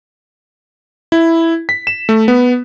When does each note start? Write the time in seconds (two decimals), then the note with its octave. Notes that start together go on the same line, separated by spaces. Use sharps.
1.12 E4
1.69 B6
1.87 E7
2.09 A3
2.28 B3